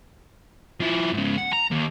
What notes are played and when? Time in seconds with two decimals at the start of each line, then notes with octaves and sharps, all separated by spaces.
0.80 F3 E4
1.12 G#2 C#3
1.38 F#5
1.53 A#5
1.71 D#2